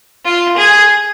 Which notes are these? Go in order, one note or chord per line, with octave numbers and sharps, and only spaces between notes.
F4
G#4